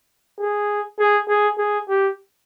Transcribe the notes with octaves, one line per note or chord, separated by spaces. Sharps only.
G#4
G#4
G#4
G#4
G4